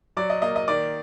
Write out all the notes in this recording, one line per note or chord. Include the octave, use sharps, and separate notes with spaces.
F#3 D5
D#5
A#3 D#5
D#5
D#3 D5